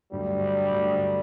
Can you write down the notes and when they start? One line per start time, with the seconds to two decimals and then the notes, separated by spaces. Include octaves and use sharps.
0.11 G2 D3 F#3 G3 A3
0.71 G2 D3 F#3 A3